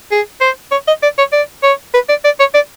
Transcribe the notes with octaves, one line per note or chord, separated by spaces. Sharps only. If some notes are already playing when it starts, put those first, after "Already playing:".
G#4
C5
C#5
D#5
D5
C#5
D5
C#5
B4
D5
D5
C#5
D5